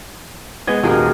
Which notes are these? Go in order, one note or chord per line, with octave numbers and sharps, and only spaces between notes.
G#3 B3 D#5 G#5 G#6
D#1 D#2 G#3 F#4 A#4